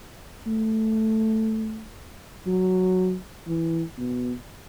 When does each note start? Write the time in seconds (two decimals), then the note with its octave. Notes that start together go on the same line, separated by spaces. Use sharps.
0.46 A3
2.47 F#3
3.47 E3
3.97 B2